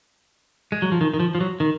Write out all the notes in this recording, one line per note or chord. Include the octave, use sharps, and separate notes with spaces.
G#3
F#3
F3
D#3
D#3
F3
F3
F#3
D#3